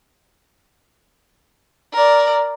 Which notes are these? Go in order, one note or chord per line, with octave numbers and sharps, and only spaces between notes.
A#4 D5